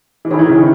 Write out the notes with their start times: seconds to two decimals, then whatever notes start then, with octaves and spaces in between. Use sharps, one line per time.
0.25 E3
0.30 D#3 E4 G#4 C#5
0.39 E3
0.49 C#3
0.57 D#3